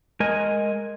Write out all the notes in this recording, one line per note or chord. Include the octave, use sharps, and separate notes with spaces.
G#3 A#4 D#5 G#5